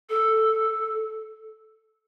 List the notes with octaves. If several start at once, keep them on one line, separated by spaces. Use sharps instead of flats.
A4